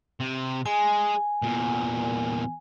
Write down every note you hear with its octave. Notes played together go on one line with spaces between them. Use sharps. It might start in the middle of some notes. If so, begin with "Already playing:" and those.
C3
G#3 G#5
E2 A#2